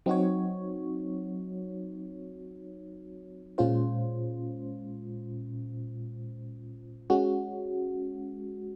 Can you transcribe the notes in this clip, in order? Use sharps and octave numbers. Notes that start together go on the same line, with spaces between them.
F#3 C4 D#4 F#4 C#5
A#2 G#3 C#4 F4 C5
G#3 C#4 F#4